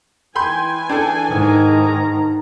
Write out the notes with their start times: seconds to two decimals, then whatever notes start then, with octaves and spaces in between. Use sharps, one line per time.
0.36 E3 G5 G#5 B5 C6 G6
0.89 D4 G#4 A4 G5
1.29 G#2 D#3 A#5